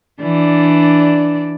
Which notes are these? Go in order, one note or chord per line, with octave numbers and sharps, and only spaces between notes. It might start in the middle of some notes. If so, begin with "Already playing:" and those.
E3 D4 D5